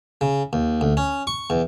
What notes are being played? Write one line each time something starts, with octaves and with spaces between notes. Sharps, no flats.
C#3
D#2
D2
C#4
C#6
E2